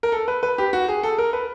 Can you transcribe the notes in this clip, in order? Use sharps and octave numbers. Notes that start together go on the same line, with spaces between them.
A#4
A4
B4
B4
G4
F#4
G#4
A4
A#4
B4